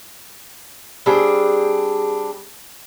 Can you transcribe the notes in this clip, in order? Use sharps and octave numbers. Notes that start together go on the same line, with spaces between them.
G3 C4 D4 G#4